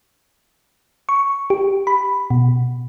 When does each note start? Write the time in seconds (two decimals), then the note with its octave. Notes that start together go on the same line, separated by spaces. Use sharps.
1.09 C#6
1.50 G4
1.87 B5
2.30 B2